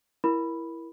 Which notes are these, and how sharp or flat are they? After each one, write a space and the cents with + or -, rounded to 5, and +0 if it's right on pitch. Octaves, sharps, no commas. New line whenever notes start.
E4 +10 A#4 +15 B5 +0